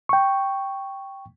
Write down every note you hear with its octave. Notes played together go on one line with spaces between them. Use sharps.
G5 C#6